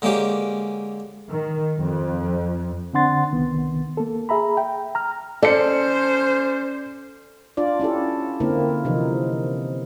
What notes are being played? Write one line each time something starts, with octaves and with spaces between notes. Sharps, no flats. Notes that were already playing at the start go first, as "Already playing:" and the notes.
D3 G#3 A#3 C#4 G4
D#3
F2
D3 C4 D4 F#5 C6 A6
C2 D#3 B3
A#3 A4
G#4 E5 A#5 B5
G5
A#5 F6
C#4 A4 C5 D5 C#7
D4 F4 D5
C#4 E4 G4 A4
D3 A#3 C4 E4 A#4
C3 E3 F3 D#4